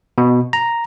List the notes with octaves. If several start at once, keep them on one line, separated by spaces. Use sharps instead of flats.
B2
A#5